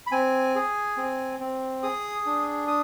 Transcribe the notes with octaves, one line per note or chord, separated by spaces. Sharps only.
B5
C4 G#5
G#4
C4
C4
G#4 D#6
D4
D#6